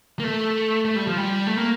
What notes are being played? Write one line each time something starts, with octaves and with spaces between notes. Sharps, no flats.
A#3
A3
A3
G3
F3
G3
A3
A#3